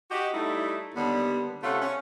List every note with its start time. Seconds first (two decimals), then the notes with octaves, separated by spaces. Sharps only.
0.11 F#4 G4 D#5
0.34 G3 A3 D#4 E4
0.95 D#2 D3 G3 B3
1.63 C3 A3 C#4 F4 E5 F#5
1.82 C#4